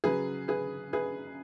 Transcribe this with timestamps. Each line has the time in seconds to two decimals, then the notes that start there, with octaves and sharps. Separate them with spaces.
0.04 C#3 F#3 G#4 B4
0.48 G#4 B4
0.93 G#4 B4